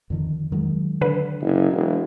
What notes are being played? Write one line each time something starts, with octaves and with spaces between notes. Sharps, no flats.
F2 D3 D#3
D#3 F#3 G#3
D3 B4
F#1
E1